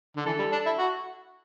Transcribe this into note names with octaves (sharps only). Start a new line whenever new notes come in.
D3
E3 A4
G3
D4
E4
F#4